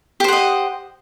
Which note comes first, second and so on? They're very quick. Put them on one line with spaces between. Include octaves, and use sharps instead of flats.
G4 C5 F#5 D#5